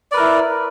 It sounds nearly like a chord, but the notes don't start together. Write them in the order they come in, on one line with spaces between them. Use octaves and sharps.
D5 B4 A#4 E4